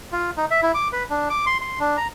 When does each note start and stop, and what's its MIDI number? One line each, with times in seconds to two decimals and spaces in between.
0.12 0.31 65
0.37 0.45 63
0.51 0.61 76
0.63 0.72 64
0.74 0.88 86
0.93 1.03 71
1.10 1.28 62
1.30 1.45 86
1.46 1.58 84
1.61 1.79 84
1.80 1.97 62
1.97 2.07 82